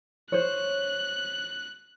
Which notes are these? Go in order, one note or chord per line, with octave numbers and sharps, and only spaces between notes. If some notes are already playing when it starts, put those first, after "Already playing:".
C5 C#5 F#6